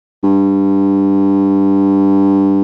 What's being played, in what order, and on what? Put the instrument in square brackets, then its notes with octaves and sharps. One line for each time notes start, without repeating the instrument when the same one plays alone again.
[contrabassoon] G2